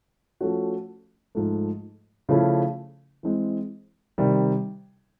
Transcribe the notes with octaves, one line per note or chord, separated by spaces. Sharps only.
F3 A3 C#4 F#4
G#2 F3 A3
C#3 F3 A3 C#4 E4
E3 G#3 C4
C3 D#3 G3